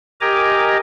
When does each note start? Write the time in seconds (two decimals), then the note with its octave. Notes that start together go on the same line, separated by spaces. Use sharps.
0.21 G4 A#4 D#5 G#5 A#5 D6